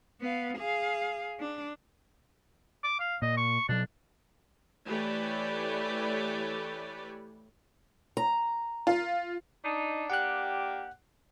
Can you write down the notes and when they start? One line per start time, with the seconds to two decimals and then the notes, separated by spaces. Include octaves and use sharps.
0.21 B3 F5
0.58 G#4 F5
1.39 D4
2.84 D6
3.00 F5
3.22 A#2 D#5
3.37 C#6
3.69 B2 F#3 D4
4.86 E3 A3 G4 B4 C#5 D5
8.17 A#5
8.87 F4
9.64 D4 D#4
10.10 A#3 D4 G4 F#5 F#6